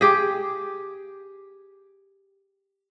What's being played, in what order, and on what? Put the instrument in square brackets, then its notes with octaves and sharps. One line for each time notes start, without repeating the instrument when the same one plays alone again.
[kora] G4 G#4